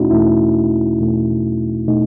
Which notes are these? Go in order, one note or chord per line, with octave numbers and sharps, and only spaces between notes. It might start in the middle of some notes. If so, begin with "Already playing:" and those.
Already playing: E2 B2 A3 C#4 D#4 E4 F#4
E2 B2 A3 E4
E2 B2 A3
B2 A3 D#4